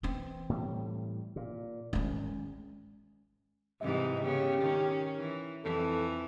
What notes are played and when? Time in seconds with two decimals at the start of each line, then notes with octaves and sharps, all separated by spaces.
0.03 E3 C4
0.49 A2 G3
1.36 A#2
1.93 G#1 E2 G#3 C#4
3.81 G#2 C3 E3 D#5
4.22 C#3 B3 G4
4.61 D#3 C#4
5.19 E3
5.64 F2 E3 A4